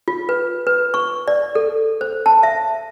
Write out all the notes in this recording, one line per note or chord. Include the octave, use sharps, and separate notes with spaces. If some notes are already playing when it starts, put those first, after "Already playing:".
F4
B4
B4
C#6
D5
A4
C5
A5
E5